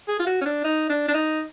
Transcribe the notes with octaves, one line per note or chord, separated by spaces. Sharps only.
G#4
F4
F#4
C#4
D4
D#4
D4
D4
D#4